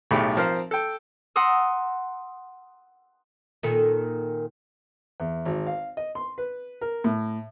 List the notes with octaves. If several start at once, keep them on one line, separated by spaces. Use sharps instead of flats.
B1 A2 A3 G4 G#4 B5
F3 C4 A#4 C5 F5
A4 G5
F#5 A#5 C6 D#6 E6
A#2 D#3 A4
E2
G#1
F5
D#5
C6
B4
A#4
A2